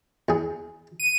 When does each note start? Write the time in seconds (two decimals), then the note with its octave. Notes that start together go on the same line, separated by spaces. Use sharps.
0.29 E2 G#4
1.00 D#7